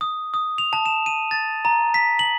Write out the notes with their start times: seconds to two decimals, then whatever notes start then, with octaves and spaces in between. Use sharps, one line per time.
0.01 D#6
0.34 D#6
0.58 F7
0.73 A5
0.86 E7
1.06 D#7
1.31 A6
1.65 A#5
1.94 B6
2.19 F#7